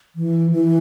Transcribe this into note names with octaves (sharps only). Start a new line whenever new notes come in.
E3
E3